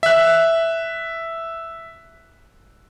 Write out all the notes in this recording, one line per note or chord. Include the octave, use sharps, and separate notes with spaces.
E5 F#6